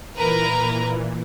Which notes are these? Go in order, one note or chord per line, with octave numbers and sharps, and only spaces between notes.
A#2 E3 A#4 B4 A#5